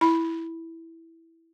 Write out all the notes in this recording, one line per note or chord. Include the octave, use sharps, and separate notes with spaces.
E4 B5